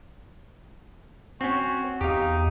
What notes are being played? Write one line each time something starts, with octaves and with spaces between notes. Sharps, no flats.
C4 C#4 F#4
E2 D#4 G4 F5